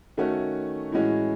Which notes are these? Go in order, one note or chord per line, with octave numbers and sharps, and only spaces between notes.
D#3 A3 C#4 F#4
A2 E3 G#3 C#4 F#4